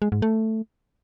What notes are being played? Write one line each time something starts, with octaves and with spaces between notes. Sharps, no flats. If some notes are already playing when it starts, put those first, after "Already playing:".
G#3
G#2
A3